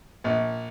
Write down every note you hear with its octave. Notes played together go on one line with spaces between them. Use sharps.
A#1